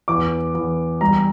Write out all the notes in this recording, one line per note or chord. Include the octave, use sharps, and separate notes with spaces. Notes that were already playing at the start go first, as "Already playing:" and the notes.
E2 D6
E2
G3 A#5